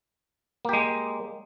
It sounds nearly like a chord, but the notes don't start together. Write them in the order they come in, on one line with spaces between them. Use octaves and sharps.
A#3 G4 G#3